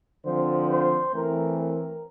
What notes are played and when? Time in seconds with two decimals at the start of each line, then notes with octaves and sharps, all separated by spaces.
0.25 D3 F3 C4 C5
0.69 C5
1.13 E3 A3 C4 A#4
1.58 A#4